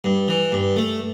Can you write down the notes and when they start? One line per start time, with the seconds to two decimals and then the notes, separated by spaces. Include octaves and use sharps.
0.04 G2
0.28 E3
0.52 G2
0.76 A3